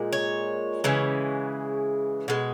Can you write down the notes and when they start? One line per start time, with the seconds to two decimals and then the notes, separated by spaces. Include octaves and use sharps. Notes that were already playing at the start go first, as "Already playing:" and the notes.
Already playing: A#2 G#3
0.13 C#5
0.84 C#3 E3 G#3
2.28 B2 G#3